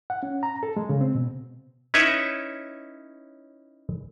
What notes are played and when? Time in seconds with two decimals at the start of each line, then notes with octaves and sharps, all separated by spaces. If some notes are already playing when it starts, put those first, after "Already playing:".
0.10 F#5
0.23 C#4
0.43 A#5
0.63 A4
0.77 G#3
0.89 C#3
1.01 C4
1.14 B2
1.94 C#4 D#4 E4 B4 C#5 E5